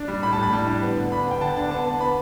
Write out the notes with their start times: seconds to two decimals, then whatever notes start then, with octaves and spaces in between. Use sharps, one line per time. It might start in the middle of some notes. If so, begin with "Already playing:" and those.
Already playing: D4
0.08 G3
0.23 A2 B5
0.33 A5
0.37 A2
0.43 B5
0.53 G3
0.67 D4
0.82 B3
0.96 D3
1.12 D4 B5
1.26 B3 G5
1.41 D3 A5
1.56 D4 A5
1.71 B3 A5
1.85 B3
2.00 B3 B5